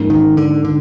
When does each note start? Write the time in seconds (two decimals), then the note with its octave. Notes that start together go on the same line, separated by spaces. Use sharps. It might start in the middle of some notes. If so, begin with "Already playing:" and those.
Already playing: G#2 F3 A#3 C#4
0.10 D#3
0.37 D3
0.65 D3